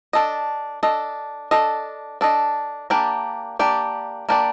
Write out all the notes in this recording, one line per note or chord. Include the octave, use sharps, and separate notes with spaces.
D4 A4 D#5
D4 A4 D#5
D4 A4 D#5
D4 A4 D#5
A#3 D4 G4 D5
A#3 D4 G4 D5
A#3 D4 G4 D5